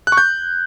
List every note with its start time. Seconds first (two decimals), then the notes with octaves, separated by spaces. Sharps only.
0.07 F#6
0.12 C#6
0.17 G6